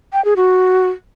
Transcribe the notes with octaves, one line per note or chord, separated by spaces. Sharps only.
G5
G#4
F#4